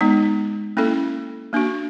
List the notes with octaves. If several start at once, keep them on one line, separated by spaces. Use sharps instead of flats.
G#3 B3 D#4
A#3 C#4 E4 A4
A#3 D4 F#4